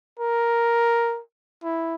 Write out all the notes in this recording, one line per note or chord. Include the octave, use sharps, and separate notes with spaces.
A#4
E4